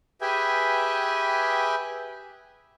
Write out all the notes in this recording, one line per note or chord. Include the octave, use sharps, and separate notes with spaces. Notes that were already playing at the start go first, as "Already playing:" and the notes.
G4 G#4 B4 E5 G5 G#5